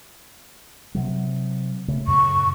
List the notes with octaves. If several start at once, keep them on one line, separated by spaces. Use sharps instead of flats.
C3 F#3
C#3 A3
F#2 A2 C#3 C#6